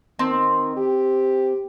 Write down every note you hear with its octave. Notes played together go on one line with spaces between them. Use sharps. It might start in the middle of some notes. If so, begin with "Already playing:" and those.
D#3 C4
G4